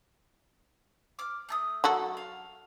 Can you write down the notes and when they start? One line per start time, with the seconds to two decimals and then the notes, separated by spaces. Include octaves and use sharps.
1.19 D6 F6
1.49 A3 A5 D#6
1.84 F#3 F#4 A4
2.17 F5